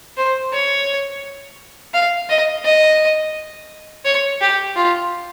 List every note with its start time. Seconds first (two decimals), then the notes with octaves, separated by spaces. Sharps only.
0.17 C5
0.53 C#5
1.94 F5
2.29 D#5
2.65 D#5
4.05 C#5
4.41 G4
4.76 F4